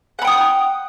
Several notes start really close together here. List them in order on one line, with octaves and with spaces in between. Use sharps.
F#5 B5 G5 D#6